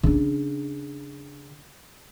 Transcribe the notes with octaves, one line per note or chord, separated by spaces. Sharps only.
C#3 D4